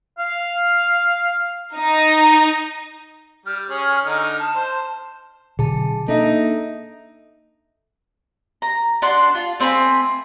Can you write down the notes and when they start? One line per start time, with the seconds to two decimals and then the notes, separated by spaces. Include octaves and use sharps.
0.19 F5
1.78 D#4
3.46 G3 F6
3.70 C#4 G#4
4.05 D3 D#4
4.39 A5
4.55 C5
5.59 B2 D3 F#3 G#4 A5
6.08 A#3 D4 D#4 A4 E5
8.62 A#5
9.02 D4 F#5 C6
9.35 F4
9.60 A3 C4 G#5 B5